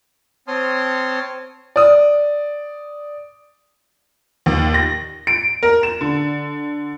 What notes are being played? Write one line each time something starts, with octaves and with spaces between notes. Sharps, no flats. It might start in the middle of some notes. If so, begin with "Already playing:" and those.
C4 C#5 A5 C6 D#6 F6
D5 D#6
D#2
A#6
D7
A#4
E7
D3